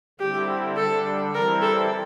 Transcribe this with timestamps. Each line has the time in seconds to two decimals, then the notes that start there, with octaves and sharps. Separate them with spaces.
0.20 D3 G3 C4 E4 G4
0.77 D3 G3 D4 A4
1.34 E3 G3 C4 E4 A#4
1.62 A4